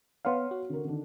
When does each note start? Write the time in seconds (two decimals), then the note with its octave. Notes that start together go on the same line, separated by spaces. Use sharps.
0.25 B3 C#5 F5 F#5 C6
0.51 F#4
0.69 D3 A#4
0.84 D3 D#3 D4